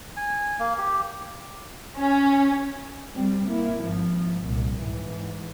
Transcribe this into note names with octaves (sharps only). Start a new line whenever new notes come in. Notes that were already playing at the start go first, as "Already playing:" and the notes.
G#5
A#3
G4
C#4
G3 C4
A#3 E4
G#1 F3
C2 A#2
G#2 E3